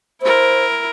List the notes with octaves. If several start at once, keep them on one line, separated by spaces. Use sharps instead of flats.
E4 A#4 C5